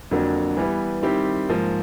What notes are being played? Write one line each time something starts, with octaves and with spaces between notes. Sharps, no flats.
F2 D3 F#3 A#3 D4
E3 G3 B3
D#3 G3 C4 E4 G4
G#2 F3 A#3